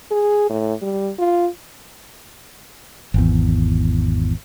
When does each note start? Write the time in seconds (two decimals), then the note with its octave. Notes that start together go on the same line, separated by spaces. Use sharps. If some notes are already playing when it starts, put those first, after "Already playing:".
0.11 G#4
0.50 A2
0.82 G3
1.19 F4
3.14 G#1 E2